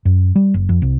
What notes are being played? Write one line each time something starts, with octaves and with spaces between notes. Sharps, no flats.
F#2
G3
F#1
F2
C2